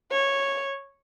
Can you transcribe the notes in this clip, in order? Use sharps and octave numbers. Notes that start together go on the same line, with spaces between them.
C#5